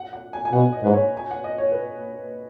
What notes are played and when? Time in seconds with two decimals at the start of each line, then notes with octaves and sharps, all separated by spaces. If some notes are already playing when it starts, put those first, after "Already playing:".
Already playing: F#5
0.13 F#5
0.33 G#5
0.45 G#5
0.53 B2 F#5
0.72 D#5
0.83 G#2 B4
0.93 C#5
1.17 G#5
1.31 F#5
1.44 D#5
1.58 C#5
1.72 B4